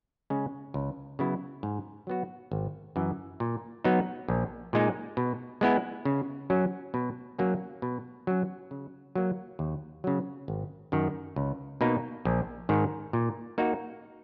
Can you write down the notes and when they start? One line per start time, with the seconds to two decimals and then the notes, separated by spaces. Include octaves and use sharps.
0.30 C#3 G#3 C#4
0.74 C#2
1.19 C#3 F#3 B3 E4
1.63 G#2
2.07 F#3 B3 F#4
2.52 G#1
2.96 F#2 E3
3.40 A#2
3.84 F#3 B3 D#4
4.28 A#1
4.73 A#2 G#3 D#4
5.17 B2
5.61 G#3 B3 E4
6.05 C#3
6.50 F#3 C#4
6.94 B2
7.38 F#3 A#3 C#4
7.82 B2
8.27 F#3 C#4
8.71 C#3
9.15 F#3 A#3
9.59 D#2
10.04 C#3 F#3
10.48 G#1
10.92 F#2 D#3
11.36 C#2
11.81 B2 A#3 D#4
12.25 A#1
12.69 G#2 D#3
13.13 A#2
13.58 A#3 D#4 F#4